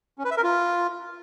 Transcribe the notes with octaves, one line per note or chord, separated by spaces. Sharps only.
C#4
B4
E5
A#4
F4